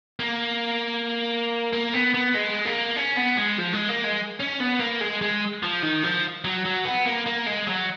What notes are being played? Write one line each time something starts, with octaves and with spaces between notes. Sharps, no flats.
A#3
A#3
B3
B3
G#3
A#3
C#4
B3
G#3
F3
G#3
A#3
G#3
C#4
B3
A#3
G#3
G#3
F3
D#3
F3
F#3
F#3
B3
A#3
A#3
G#3
F#3